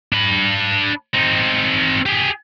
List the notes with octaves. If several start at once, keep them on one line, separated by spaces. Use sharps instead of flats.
D4 B5
C4 D#4
G4 G#4